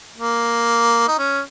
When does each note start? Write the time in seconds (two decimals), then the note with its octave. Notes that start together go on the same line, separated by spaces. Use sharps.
0.16 A#3
1.08 D#4
1.18 C#4